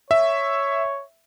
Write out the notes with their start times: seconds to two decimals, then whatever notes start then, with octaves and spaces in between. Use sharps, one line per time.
0.11 C#5 E5